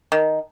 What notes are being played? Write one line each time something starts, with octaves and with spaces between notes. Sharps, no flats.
D#3